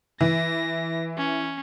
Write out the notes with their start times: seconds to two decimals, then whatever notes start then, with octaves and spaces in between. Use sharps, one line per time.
0.21 E3 A#6
1.17 C#4